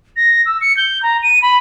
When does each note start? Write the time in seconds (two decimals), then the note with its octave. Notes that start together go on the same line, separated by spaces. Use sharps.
0.16 A#6
0.46 E6
0.61 C#7
0.77 G6
1.03 A#5
1.23 D#7
1.42 B5